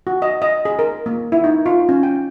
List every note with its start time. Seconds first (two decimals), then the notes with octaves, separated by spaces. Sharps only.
0.07 F#4
0.22 D#5
0.42 D#5
0.65 G#4
0.79 A#4
1.06 A#3
1.32 E4
1.44 D#4
1.66 F4
1.89 C#4
2.03 G5